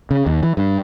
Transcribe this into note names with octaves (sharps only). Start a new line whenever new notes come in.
C#3
D#2
E3
G2